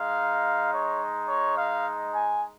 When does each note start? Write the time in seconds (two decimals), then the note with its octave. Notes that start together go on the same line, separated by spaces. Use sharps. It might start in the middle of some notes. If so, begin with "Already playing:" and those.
Already playing: G#3 D#4 F5
0.73 C#5
1.29 C#5
1.58 F5
2.14 G#5